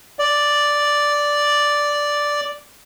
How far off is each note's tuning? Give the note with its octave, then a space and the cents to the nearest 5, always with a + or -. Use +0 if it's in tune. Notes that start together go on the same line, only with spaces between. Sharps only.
D5 -5